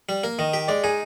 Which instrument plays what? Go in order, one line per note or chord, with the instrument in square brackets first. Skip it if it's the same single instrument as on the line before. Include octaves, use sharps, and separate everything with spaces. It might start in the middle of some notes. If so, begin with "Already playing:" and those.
[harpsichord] G3
A#3
[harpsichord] D#3 [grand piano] D#5
[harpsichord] G4
[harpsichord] G#3 [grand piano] D5
[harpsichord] D#4 [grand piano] G#4